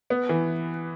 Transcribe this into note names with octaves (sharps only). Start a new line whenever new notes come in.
B3
E3